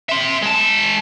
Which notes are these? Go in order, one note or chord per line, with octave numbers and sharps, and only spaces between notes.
E5 C6
G#3 A5